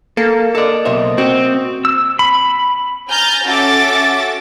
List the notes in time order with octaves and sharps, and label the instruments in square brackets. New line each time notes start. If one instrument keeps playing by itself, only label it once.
[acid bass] A#3 [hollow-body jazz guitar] A4
[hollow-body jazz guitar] A4 D5 [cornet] D#5
[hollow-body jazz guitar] B1 C5 E5
[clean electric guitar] C4 [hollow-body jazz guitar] F#4
[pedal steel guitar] E6
B5
[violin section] G#5 A#5 F6 G6 A6
C#4 F#4 A4 E5 D6 A6